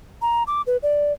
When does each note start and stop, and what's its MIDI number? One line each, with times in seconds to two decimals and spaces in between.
0.22 0.43 82
0.47 0.62 86
0.67 0.77 71
0.83 1.13 74